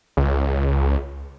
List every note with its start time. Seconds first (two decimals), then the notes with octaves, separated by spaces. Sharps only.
0.17 C#2